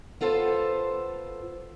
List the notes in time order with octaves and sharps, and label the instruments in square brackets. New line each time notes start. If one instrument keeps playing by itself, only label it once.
[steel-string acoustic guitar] B3 F4 A4 C5